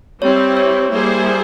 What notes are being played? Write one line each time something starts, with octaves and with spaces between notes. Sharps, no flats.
G3 C4 E4 C#5
C#5
G3 A#3 E4 G#4 C5